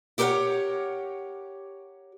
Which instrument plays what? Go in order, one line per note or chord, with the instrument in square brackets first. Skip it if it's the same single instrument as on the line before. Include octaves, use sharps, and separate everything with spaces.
[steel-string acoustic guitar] E4 G4 A#4 B4 C#5 F#5